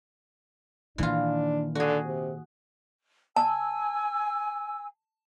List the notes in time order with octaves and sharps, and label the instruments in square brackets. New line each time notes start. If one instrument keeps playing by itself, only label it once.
[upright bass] A#2 D#3 [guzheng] E3 F4 [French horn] D4
[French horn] D3 [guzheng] F#4 G#4
[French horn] C3
[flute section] G#5 E6 [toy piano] A5